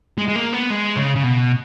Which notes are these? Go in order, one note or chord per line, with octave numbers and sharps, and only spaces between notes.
G#3
G#3
A#3
B3
G#3
C#3
C#3
B2